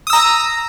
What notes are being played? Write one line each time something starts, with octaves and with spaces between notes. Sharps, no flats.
A#5 D#6 E6